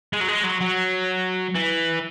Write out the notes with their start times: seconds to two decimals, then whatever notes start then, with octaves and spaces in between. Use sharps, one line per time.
0.13 G#3
0.21 F#3
0.28 G#3
0.44 F#3
0.61 F#3
1.55 E3